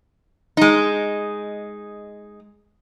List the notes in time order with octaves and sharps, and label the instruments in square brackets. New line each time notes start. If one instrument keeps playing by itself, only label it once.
[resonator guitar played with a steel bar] G#3 D#4